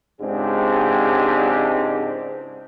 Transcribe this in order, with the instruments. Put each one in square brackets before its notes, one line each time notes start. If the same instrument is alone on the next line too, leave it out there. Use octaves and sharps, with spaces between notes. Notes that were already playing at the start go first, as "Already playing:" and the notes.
[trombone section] C#2 G#2 G#3 C4 D4 G4